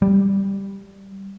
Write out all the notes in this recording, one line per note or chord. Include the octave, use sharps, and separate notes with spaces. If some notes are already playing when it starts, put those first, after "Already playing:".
G3